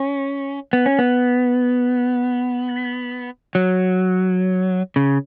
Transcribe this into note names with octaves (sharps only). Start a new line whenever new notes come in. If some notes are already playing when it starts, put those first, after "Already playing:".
Already playing: C#4
B3
C#4
B3
F#3
C#3